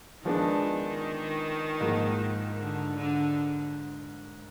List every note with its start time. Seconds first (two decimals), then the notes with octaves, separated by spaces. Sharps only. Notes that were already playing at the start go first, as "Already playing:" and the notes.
0.25 D#3 F3 G#3 B3 D4
1.80 G#2 F3 A#3 D#4
2.59 D3
2.96 D3